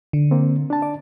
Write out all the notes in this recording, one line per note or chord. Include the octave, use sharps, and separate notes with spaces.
D3
A#3 C4
D4 A5
D5